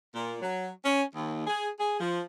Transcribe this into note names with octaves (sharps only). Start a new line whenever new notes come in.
A#2
F#3
C#4
D#2
G#4
G#4
F3